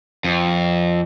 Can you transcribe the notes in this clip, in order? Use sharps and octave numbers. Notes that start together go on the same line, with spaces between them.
F2